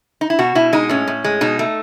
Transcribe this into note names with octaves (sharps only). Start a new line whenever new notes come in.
D#4
E4
B2 F#4
B2 E4
G#3 D#4
A2 C#4
A2
G#3
B2 D#4
A3